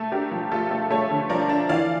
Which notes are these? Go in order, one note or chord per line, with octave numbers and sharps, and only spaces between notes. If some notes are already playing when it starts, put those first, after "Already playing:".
Already playing: A3
D4 G4 A#4
F3
A3 F4 A4
A3
A3 A4 C#5
D3
F3 A#4 D5
D4
E3 D5 F5